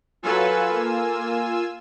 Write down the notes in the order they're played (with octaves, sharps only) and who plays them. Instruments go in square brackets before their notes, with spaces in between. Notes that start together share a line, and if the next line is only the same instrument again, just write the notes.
[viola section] F#3 A4 B4 [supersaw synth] F4 G#5 E6
[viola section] A#3